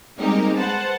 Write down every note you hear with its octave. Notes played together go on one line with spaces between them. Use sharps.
G3 G#3 A#3 C4 D#4 G4
B4 C5 F#5 A5